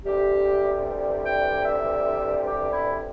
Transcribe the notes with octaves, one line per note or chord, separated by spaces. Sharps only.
D2 C3 E3 G3 G4
G5
E5
G4
E4